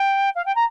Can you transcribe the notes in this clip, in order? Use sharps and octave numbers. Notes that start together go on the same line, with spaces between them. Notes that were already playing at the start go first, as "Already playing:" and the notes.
Already playing: G5
F5
G5
A#5